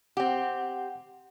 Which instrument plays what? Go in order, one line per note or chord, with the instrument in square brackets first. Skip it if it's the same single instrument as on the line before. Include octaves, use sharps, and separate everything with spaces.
[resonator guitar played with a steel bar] C4 G4 [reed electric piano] F#5